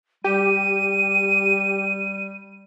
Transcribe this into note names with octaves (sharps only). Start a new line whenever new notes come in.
G3 G4 D#7